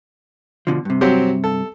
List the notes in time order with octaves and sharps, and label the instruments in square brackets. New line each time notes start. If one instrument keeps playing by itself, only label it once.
[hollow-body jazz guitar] B2 D3 F3
G2 C3
[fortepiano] F#3 C4 G4
A4